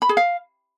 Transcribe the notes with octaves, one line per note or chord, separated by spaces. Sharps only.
B5
G#4
F5